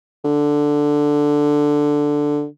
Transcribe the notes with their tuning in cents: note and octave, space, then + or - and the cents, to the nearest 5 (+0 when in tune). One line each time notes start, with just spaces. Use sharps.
D3 +5